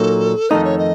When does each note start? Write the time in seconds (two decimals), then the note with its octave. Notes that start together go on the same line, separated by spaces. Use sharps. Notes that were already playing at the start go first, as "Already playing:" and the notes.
Already playing: A#2 F#3 A#3 D#4 A4
0.50 F2 D#3 A3 D#4 D#5
0.64 C#5
0.79 D#5